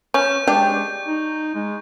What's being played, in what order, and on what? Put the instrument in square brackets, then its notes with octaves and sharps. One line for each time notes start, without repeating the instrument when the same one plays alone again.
[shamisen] C#4 [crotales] C#6 G6
[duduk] G#3 [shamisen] D4 G4
[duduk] D#4
G#3